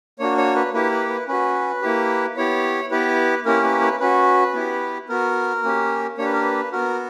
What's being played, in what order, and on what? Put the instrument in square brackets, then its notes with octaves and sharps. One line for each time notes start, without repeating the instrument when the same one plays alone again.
[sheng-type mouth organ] A#3 D4 F#4 C#5
C#5
B4
A#3 E4 G4 B4
B4
B4
C#4 F#4 B4
A#3 E4 G4
B3 E4 G4 C#5
B3 E4 G4 B4
A#3 C#4 E4 G4 A#4
B4
B4
C#4 F#4 B4
B3 E4 G4
B3 F#4 A#4
A#3 C#4 G4
A#3 D4 G4 C#5
B4
A#4
B4
B3 F#4 A#4